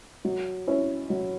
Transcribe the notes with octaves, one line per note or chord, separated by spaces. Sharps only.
F#3
C#4 E4
F#3